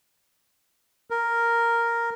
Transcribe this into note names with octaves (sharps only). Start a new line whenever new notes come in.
A#4